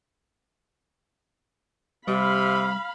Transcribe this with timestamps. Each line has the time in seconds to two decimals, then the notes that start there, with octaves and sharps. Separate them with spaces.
2.08 C3 G3 F5 B5